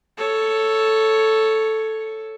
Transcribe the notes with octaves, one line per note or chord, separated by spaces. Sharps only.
A4 C#5